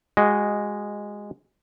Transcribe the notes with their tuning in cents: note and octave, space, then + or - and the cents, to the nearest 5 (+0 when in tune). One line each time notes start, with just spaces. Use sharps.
G#3 -10 F#4 +10 D#5 +0